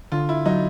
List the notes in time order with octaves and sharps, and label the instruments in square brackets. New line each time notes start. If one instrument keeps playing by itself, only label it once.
[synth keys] D3 [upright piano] F4
[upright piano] E4
[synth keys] F#3 [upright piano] D#4